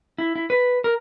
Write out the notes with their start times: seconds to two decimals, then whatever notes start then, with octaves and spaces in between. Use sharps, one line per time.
0.18 E4
0.36 E4
0.50 B4
0.84 A#4